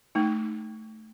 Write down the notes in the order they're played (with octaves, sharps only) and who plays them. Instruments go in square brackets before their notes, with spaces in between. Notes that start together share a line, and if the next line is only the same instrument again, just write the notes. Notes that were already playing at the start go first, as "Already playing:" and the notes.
[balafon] A3 D#4